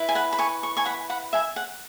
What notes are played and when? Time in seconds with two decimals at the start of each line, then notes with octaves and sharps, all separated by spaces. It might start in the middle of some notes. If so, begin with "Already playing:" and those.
Already playing: E4 B4
0.09 G#5
0.15 F#5 B5
0.33 B5
0.39 G#5 C#6
0.63 C#6
0.77 G#5 C#6
0.85 F#5 B5
1.10 F#5 B5
1.33 E5 G#5
1.56 F#5